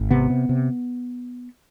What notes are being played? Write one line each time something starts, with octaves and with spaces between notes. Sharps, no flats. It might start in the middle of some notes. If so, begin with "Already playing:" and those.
Already playing: G#1
C3 B3
C3
C3